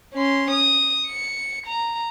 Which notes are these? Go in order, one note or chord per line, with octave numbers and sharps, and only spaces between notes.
C#4 C6
D#6
C#7
A#5